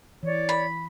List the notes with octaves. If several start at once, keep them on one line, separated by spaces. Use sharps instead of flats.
E3 C#5 D5
B5